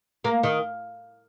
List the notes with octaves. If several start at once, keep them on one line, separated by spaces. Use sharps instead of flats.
A#3
D#3